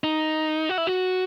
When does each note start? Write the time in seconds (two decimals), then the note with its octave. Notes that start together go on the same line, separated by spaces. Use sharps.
0.04 D#4
0.69 F#4
0.78 E4
0.87 F#4